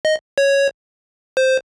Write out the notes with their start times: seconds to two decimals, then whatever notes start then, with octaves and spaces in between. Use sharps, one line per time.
0.05 D#5
0.38 C#5
1.37 C5